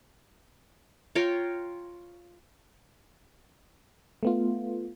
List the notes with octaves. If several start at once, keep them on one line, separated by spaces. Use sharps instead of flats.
F4 C#5 G5 A#5
A3 B3 F4